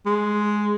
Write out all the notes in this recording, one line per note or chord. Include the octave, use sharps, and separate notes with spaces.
G#3